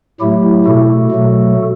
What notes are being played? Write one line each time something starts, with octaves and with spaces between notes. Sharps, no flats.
A2 F#3 A3 E4 G4
B2 A3 F#4 A4
B2 F#3 A3